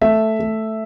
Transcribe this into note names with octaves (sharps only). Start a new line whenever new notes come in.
A3 E5
A3